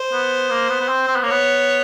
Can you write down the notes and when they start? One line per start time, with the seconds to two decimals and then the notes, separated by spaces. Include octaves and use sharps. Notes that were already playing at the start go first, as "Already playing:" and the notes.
Already playing: C5
0.12 B3
0.50 A#3
0.69 B3
0.81 B3
0.88 C4
1.08 C4
1.16 B3
1.23 A#3
1.27 B3 C#5